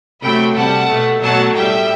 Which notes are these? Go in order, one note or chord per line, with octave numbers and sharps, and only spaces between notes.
C3 F#3 A3 G5 B5
C3 G3 F#5 A5
B2 A3
B2 F#3 A3 F#5 A5
A2 G3 E5 G5